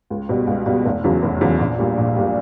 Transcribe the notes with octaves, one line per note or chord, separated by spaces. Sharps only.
C#2
B2 G3
C#2
B2 G3
F1
E2 C#3 F#3
F1
E2 C#3 F#3
A#1
A#2 G3
A#1
A#2 G3